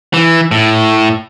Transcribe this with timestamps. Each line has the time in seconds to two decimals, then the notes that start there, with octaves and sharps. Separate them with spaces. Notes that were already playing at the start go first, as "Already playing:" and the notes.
0.14 E3
0.51 A2